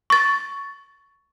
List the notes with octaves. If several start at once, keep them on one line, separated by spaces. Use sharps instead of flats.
C#6 A6